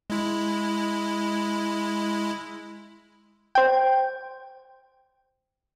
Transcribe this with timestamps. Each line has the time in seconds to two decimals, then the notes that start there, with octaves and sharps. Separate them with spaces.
0.10 G#3 E4
3.55 C5 G5